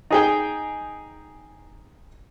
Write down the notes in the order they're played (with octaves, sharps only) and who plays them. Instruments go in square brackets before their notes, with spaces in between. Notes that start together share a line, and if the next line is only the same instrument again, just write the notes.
[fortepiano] D#4 G#4 G5